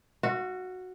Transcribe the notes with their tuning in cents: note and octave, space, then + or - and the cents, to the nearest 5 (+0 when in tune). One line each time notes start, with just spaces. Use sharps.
F#4 -5 F5 -45